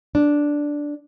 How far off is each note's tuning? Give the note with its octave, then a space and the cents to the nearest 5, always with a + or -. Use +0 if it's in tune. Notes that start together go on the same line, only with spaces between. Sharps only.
D4 -5